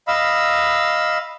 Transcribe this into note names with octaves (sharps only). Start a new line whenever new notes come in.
D#5 F5 B5 E6